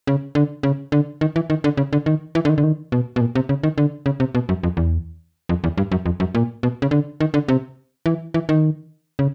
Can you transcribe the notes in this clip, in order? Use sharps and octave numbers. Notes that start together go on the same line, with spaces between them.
C#3
D3
C#3
D3
D#3
E3
D#3
D3
C#3
D3
D#3
E3
D3
D#3
D3
D#3
B2
B2
A#2
C3
C#3
D#3
D3
C#3
C3
B2
F#2
F2
E2
F2
E2
G2
F#2
F2
F#2
A#2
B2
C#3
D3
D#3
D3
C3
E3
E3
D#3
C#3